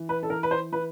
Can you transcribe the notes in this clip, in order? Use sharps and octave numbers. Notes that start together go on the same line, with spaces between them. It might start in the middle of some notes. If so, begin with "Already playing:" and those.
Already playing: E3
B4
A4
E3 A#4
B4
C5
E3 B4